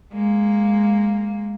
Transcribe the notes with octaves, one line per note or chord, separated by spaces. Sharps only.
G#3 A#3